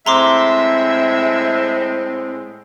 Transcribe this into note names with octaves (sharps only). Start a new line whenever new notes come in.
A2 G#3 C4 E5 A#5 C6 D6